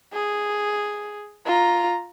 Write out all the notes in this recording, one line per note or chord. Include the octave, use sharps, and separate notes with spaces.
G#4
F4 A#5